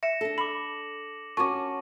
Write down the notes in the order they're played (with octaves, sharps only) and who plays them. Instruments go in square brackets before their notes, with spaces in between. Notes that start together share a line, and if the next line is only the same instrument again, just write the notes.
[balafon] E5 [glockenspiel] A#6 C#7 E7
[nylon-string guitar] D4 A4
[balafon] B5 [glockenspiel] D6 F#7
[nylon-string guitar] C#4 F#4 A#4 [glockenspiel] A5 [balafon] C#6 D6